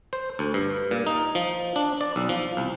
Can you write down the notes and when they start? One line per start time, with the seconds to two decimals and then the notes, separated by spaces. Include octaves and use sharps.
0.13 C5
0.39 D2
0.54 G2
0.91 A#2
1.07 D#4
1.35 F3
1.76 D4
2.01 D5
2.16 B1
2.29 F3
2.57 C2